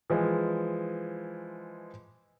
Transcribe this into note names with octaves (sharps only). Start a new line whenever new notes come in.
E3 F3 G#3